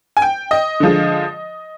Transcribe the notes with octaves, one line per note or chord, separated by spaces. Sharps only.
G#5
G5
D#5
D3 F3 G#3